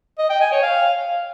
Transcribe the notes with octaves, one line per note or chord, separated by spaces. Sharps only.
D#5
G5
G#5
C#5
F5